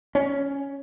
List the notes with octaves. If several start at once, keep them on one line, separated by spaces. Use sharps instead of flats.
C#4